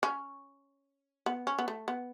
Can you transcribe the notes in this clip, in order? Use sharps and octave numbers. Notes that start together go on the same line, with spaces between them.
C#4
B3
C#4
B3
A3
B3